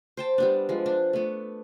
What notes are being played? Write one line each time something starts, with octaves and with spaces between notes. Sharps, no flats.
C5 G5 A5
G3 B3 D4
F3 G#3
D4
A3 B3